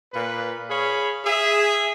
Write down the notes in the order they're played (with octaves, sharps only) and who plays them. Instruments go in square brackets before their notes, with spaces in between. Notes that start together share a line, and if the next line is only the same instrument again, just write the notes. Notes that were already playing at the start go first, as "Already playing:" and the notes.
[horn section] A#2 B4
G#4 C#5 F5 B5
G#4 E5